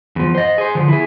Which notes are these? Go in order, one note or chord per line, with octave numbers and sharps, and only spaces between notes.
E2 F3
C5 D#5
G#4 C5
D3 F3
E4 G#4